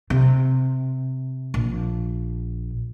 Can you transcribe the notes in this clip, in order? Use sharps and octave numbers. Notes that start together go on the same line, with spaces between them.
C3
A#1